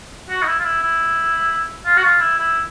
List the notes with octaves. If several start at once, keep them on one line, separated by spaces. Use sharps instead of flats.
F#4
D#4
E4
F4
E4
E4
F4
F#4
F4
E4
E4